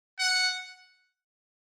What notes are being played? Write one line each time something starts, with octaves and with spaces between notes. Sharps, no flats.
F#5